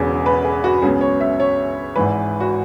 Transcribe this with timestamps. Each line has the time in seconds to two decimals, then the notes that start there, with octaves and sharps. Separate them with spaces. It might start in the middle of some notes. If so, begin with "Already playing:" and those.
Already playing: E1 E2 C#3 F#3 B3 G#4
0.26 B4
0.45 G#4
0.64 F#4
0.82 C#2 C#3 F#3 B3 G#4
1.01 C#5
1.21 E5
1.40 C#5
1.96 G#1 G#2 E3 B4
2.40 F#4